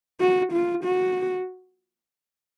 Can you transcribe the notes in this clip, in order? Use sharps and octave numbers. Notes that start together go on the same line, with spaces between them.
F#4
F4
F#4